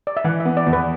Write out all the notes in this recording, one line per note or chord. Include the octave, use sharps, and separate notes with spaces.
D5
E5
E3 F#5
E5
B3
D5
E2
B4